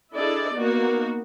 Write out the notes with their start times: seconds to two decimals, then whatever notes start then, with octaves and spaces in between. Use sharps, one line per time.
0.13 D4 E4 G#4 A4 D5 D#5
0.54 A#3 B3 D#4 F#4